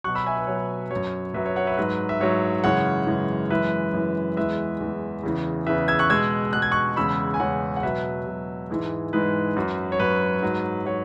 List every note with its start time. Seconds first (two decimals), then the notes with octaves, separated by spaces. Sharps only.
0.04 F#3 C#6 F#6
0.07 B2
0.15 B5 E6
0.26 E5 G#5
0.37 B4
0.47 B2 F#3 C#5
0.56 B4
0.91 F#2 F#3 C#5
1.34 F#2 F#3 B4 E5
1.46 C#5
1.56 C#5 F#5
1.67 B4 E5
1.77 G#2 F#3 B4
2.09 E5
2.20 G#2 F#3 C#5
2.64 F#2 C#3 E3 G#3 C#5 F#5
3.07 F#2 C#3 E3 G#3
3.50 F#2 E3 G#3 B4 E5
3.93 F#2 E3 G#3
4.37 E2 E3 G#3 B4 E5
4.80 E2 E3 G#3
5.23 E2 C#3 E3
5.67 E2 C#3 E3 B4 E5
5.88 E6 G#6
5.99 C#6 F#6
6.10 B2 G#3 E6 G#6
6.53 B2 G#3 F#6
6.62 G#6
6.71 C#6 F#6
6.96 E2 C#3 G#3 B5 E6
7.34 G#5
7.40 E2 C#3 G#3 C#5 F#5
7.76 F#5
7.83 B2 F#3 B4 E5
8.27 B2 F#3
8.70 G#2 E3 G#3
9.13 G#2 E3 G#3 B4
9.56 F#2 F#3
9.92 C#5
10.00 F#2 F#3 B4
10.42 G#2 F#3
10.86 F#3 C#5